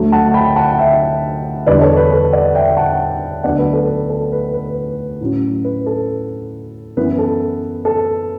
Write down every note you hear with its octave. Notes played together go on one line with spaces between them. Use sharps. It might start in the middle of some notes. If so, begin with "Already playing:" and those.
Already playing: D2 D3 F#3 A3
F#5 A5
G5 B5
F#5 A5
E5 G5
E2 D3 G3 D4 B4 D5
A4 C#5
B4
A4
D5 F#5
E5 G5
F#5 A5
D2 D3 F#3 B3 D4 D5 F#5
B4
A4
B4
A4
B4
B4
A2 F#3 C#4
B4
A4
F#2 E3 B3 E4 B4
A4
A4